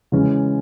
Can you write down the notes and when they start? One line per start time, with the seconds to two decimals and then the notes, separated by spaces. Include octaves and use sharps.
0.12 C#3 E3 G#3 C#4